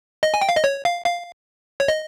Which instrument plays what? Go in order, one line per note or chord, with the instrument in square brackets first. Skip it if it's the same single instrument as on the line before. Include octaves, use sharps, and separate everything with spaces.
[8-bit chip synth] D#5
G#5
G5
F5
D#5
C#5
F5
F5
C#5
D#5